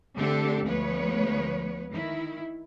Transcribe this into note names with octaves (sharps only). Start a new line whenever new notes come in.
D3 A3 C4 D4 G4 A4
D2 F3 G#3 B3 B4 C#5
D#3 E4